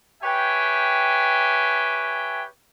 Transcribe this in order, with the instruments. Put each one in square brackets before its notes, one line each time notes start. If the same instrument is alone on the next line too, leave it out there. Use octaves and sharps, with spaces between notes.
[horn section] G4 B4 C#5 E5 G5 G#5